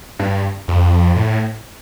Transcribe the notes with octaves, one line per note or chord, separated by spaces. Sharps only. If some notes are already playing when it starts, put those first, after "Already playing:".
G2
F2
A2